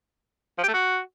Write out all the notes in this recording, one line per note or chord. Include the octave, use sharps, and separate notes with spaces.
F3
G4
A3
F#4